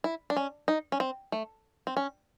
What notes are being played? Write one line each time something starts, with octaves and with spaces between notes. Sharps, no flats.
E4
D4
C#4
D#4
C#4
C4
A3
C4
C#4